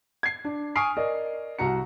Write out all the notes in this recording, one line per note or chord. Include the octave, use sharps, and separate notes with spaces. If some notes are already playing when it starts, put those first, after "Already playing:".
G#6 C7
D4
G#5 C#6 D#6 F6 C7 D7
A#4 D5 D#5
C2 F#4 A#5 C#7